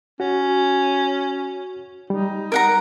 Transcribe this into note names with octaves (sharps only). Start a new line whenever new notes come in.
C#4 F#4
G3 D#4
A#4 F#5 A#5